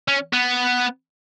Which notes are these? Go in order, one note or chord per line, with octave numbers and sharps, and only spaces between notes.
C#4
B3